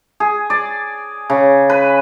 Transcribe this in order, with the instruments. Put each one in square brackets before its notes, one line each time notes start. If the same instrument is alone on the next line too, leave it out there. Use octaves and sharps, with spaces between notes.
[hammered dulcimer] G#4
D5
C#3
B4